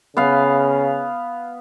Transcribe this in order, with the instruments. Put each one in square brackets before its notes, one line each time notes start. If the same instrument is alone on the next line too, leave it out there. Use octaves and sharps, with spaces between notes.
[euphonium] C#3 [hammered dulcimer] B3 F5